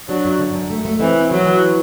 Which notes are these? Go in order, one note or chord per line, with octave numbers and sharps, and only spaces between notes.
F#3 D4
F#2
D3
F#2
A3
A3
E3 C4
C4
E3 F#3
E3